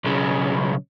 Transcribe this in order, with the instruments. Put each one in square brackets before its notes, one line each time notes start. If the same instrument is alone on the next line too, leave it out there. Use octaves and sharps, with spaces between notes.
[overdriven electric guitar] B1 C#3